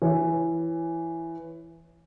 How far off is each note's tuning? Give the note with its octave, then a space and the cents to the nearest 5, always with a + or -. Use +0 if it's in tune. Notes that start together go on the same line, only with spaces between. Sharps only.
E3 +10 C#5 +0